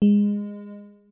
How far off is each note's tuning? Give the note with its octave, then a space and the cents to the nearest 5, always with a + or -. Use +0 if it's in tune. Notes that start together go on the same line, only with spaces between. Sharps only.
G#3 -20